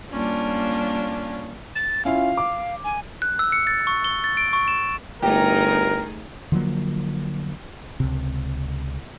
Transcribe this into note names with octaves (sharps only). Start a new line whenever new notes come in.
G3 A#3 C#4 D4 F4
A6
C#4 E4 F4 F5
D6
G#5
F#6
E6
C#7
A6
C#6
G7
A6
D7
C#6
E7
G1 A3 D#4 G4 G#4 A#4
D3 F3 F#3 A#3
C#2 C3